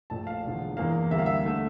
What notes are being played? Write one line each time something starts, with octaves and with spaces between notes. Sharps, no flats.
A#1 A#2 A3 A5
F5
E1 E2 D3
E2 E3 A#3 F5
D2 D3 G3 A#3 E5
F5
E5
D3 A3